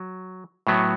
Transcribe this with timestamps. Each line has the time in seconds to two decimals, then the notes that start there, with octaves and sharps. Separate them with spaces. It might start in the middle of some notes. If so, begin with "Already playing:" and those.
Already playing: F#3
0.67 A2 F#3 B3